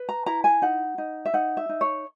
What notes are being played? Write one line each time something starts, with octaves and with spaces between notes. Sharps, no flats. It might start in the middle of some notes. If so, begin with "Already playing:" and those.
Already playing: B4
A#5
E4 A#5
G#5
D#4 F#5
D#4
E5
D#4 F#5
E5
D#4
C#5